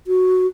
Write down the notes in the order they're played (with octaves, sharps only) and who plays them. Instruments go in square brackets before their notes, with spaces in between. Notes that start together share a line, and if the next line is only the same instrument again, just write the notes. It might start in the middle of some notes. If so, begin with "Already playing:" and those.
[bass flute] F#4